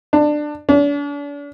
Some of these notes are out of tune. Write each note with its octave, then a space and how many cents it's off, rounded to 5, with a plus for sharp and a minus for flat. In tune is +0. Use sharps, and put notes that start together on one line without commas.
D4 +20
D4 -40